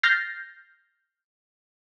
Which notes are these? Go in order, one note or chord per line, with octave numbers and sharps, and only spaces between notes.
F6 G6 A6 A#6 C7